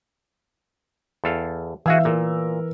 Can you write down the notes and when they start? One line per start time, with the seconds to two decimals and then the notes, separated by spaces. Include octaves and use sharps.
1.24 E2 A4 F5
1.86 E3 F#4 G#4 E5 F5 G#5 E6
2.05 A#2 A#4